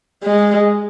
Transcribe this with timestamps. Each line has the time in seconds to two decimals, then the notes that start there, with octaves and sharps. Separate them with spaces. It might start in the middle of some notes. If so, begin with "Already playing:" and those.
0.23 G#3